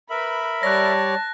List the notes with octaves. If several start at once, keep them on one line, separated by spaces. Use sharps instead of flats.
A#4 B4 E5 B5
G3 C#5 D5 A5 F#6 A#6